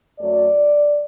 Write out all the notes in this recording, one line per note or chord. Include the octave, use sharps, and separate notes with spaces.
F#2 F#3 A3 D5